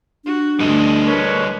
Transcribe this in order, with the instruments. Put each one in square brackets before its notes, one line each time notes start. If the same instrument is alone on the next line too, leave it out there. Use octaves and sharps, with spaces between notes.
[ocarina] D4 [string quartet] F#4
[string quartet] D2 E3 [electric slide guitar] G3 A4 D#5
[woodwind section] A#4 B4 C#5